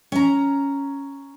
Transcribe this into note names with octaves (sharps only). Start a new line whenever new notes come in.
C#4 A#5